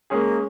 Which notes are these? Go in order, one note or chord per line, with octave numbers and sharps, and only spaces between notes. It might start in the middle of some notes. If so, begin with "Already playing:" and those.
G#3 A#3 C#4 G#4